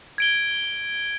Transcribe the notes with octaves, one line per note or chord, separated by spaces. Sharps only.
G#6 D7 G7